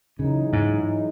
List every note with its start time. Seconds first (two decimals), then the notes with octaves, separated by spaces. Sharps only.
0.19 F#2 C#3 E3 G#3 D#4
0.53 G#2